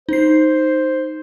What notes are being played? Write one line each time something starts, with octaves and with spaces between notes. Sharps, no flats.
D#4 C5 C7